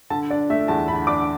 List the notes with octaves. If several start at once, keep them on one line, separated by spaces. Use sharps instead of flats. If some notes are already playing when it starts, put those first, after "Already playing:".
D3 A5
D4 D5
A3 E5
E2 A5
D3 B5
D4 D6